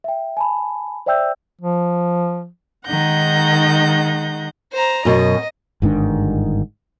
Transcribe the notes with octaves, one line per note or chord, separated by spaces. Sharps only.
E5 G5
G#5 A5 B5
C5 D5 E5 G5 E6 G6
F3
D#3 G#3 D#4 F#5 G6 A#6
C5 A#5
F#2 B2 D#5
G1 G#2 D#3 D4